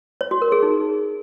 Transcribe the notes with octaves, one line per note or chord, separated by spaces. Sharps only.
C#5
F#4
A#4
G#4
D#4